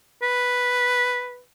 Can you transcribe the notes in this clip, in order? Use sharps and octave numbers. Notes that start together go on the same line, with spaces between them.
B4